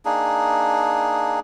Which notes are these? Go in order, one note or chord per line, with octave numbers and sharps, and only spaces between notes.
A#3 D4 D#4 G#4